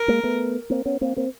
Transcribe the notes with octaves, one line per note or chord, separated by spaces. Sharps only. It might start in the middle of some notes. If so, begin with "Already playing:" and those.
Already playing: A#4
G#3 A#3
A3 B3
A#3 C4
B3 C#4
A#3 C4
A#3 C4